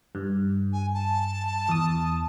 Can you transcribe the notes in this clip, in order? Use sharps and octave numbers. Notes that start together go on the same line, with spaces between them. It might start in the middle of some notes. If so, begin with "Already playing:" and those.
G2
G#5
A5
E2 D#6